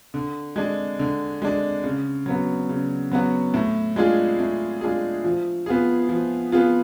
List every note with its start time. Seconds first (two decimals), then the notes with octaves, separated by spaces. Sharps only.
0.14 D3
0.56 G#3 D4
0.99 D3
1.42 G#3 D4
1.84 C#3
2.26 F#3 B3 F#4
2.69 C#3
3.11 F#3 B3 F#4
3.54 A2
3.96 G#3 D4 F4 G#4
4.39 A2
4.81 G#3 D4 F4 G#4
5.24 F3
5.66 B3 F4 G#4
6.09 F3
6.52 B3 F4 G#4